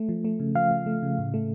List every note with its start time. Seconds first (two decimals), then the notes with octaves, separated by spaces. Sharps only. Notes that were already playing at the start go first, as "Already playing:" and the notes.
Already playing: A3
0.09 F3
0.24 A3
0.40 C#3
0.55 F3 F5
0.71 F3
0.86 A3
1.03 C#3
1.18 A2
1.34 A3